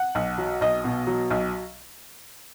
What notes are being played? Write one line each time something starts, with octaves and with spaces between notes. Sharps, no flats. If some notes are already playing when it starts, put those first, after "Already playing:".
Already playing: F#5
B1
F#3
B1 D#5
B2
F#3
B1